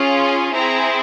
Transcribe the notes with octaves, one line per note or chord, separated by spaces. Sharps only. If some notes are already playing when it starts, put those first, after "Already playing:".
Already playing: C#4 F4 G#4
G#5
C4 E4 G#4 A#5